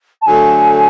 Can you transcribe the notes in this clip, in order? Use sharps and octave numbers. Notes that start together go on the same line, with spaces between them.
A5
D3 F#3 A3 G#5